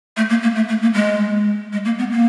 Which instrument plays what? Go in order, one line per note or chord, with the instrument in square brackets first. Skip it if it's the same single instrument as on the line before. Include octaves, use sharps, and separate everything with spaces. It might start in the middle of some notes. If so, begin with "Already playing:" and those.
[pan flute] A3
A#3
A#3
A3
A3
A#3
G#3
G#3
A#3
B3
A#3